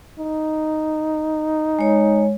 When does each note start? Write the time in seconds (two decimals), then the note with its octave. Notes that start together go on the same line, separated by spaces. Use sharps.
0.19 D#4
1.79 G#3 C#5